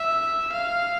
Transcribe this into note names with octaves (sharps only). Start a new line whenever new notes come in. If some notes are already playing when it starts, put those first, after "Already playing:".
Already playing: E5
F5